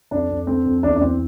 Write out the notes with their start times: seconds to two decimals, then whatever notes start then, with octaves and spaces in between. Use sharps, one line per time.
0.11 F2 D4
0.29 F2
0.47 D3 C4
0.66 F2
0.83 E2 D4
0.96 D4
1.01 E2 C4